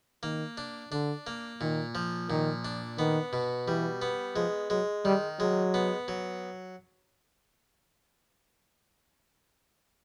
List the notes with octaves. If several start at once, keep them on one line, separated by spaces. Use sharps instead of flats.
D#3 A#3
D4
D3 D4
A#3
A#2 D#3
F3
A#2 D#3
D4
D#3 B3
B2
E3 G3
B3
F3 G#3
F#3 G#3
D#3 G3
F#3 G#3
B3
F#3